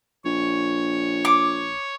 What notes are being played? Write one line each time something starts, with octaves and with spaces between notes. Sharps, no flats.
A#1 C#5
D6